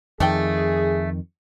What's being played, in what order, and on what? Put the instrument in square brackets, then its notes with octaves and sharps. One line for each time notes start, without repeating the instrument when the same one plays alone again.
[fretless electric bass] F2 D#3 [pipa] A3 D5 G5 [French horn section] G#4